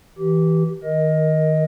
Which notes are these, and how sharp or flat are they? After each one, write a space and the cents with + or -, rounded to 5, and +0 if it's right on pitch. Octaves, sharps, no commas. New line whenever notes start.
E3 -20 G4 -20
D#3 +0 A#4 +20 D#5 +10